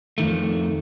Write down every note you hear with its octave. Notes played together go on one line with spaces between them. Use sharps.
F2 D#3 A3